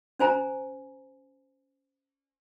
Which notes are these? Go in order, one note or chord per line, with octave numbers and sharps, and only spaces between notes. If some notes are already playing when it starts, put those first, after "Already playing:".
C#4 C5 G#5 A#5